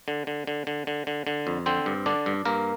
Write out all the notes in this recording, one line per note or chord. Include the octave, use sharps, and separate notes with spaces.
D3
D3
D3
D3
D3
D3
D3
F2
D3 C4 C5
G2
D3 D4 D5
G2
G2 A#3 A#4